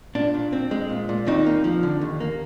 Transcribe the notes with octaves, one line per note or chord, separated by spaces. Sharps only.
A#2 D4
A#2
C4
G#3
A#2
A#2
D#2 C4 D#4
A#3
F3
D3
D#2
A#3